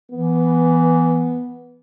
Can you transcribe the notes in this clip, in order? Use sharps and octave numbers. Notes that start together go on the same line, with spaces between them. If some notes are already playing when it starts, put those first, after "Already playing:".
E3 B3